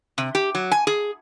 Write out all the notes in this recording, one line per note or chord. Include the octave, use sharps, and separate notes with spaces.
C3
G4
F#3
G#5
G#4